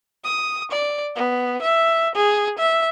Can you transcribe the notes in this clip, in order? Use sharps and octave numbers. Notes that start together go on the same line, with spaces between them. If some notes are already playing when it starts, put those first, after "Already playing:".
D#6
D5
B3
E5
G#4
E5